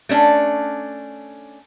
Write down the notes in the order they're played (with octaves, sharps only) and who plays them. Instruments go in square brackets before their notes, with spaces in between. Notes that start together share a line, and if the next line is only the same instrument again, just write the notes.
[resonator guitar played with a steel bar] A3 C#4 D4